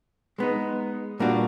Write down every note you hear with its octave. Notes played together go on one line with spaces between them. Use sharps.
G#3 B3 D#4
A#2 G3 A#3 D4 F#4